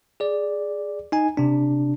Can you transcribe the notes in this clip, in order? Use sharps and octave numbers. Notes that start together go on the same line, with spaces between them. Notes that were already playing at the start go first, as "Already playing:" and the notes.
G#4 D5
D#4 G#5
C3 D4